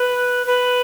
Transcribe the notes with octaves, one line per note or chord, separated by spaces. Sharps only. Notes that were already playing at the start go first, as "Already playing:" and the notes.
Already playing: B4
B4